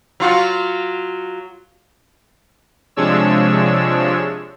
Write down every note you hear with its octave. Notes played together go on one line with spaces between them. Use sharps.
F#3 F4 F#4
C3 F3 G#3 D4 C#5 E6